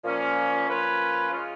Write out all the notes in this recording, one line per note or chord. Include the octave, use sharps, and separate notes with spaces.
A#2 F3 A#3 C#4
F3 A#3 C#4 F4 B4
C#3 G#3 C#4 F4